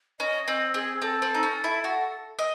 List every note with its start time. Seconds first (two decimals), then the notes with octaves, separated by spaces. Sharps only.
0.20 C#4 D#5
0.48 C4 D#5
0.74 C4 G#4
1.02 C4 A4
1.22 C4
1.34 D#4
1.43 C#4
1.64 E4
1.84 F#4
2.39 D#5